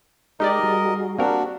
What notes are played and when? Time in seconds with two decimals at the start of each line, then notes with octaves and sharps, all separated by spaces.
0.40 G#3 D#4 G4 A#4 D5 D#5
0.63 G3 F#4 G#4
1.19 A#3 C4 D4 F#4 G4 A#4